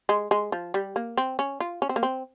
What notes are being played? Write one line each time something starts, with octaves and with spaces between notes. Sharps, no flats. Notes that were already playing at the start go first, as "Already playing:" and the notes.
G#3
G#3
F3
G3
A#3
C4
C#4
F4
C#4
C4
A#3
C4